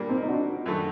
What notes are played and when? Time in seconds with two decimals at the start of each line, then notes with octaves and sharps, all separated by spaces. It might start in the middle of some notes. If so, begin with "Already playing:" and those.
Already playing: A#2 G3 A#3 D4
0.09 C4 D#4
0.23 D#4
0.28 D4 F#4
0.66 F#2 D#3 A3